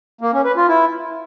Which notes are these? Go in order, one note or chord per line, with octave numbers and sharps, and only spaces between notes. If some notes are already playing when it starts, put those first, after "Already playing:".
A#3
C#4
B4
F4
E4